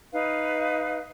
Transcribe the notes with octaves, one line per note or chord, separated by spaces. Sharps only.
D#4 B4 F5